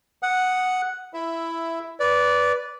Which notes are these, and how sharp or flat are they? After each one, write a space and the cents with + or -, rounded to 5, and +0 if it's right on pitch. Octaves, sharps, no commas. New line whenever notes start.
F#5 +0 D#6 +0
E4 +10 E5 +0
B4 +0 D5 -15